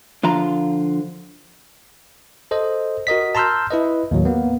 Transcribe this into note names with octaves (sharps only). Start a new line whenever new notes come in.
D3 F3 F4 F5 A#5
A4 C5 D#5
F#4 A#4 D#5 B6
A5 A#5 C6 E6 F6 G6
E4 B4 D#5
D#2 A2 F#3
A#3 B3